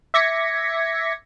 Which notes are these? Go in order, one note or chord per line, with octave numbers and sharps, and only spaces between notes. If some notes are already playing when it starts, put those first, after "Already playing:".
E5 D6 G#6 A#6 B6 C#7